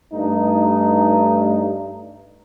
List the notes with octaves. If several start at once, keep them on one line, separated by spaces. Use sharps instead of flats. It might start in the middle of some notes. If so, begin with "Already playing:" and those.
G2 A3 D#4